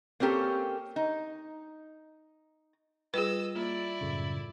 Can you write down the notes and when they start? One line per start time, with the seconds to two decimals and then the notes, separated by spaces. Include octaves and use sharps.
0.20 A#3 C4 C#4 G4 A4
0.96 D#4
3.14 G3 F4 G#4 B4 D#5 E6
3.55 A#3 E4 F4 D5
4.01 F#2 A2 C#3